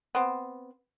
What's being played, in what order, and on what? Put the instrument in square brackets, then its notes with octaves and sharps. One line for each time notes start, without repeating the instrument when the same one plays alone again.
[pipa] B3 C4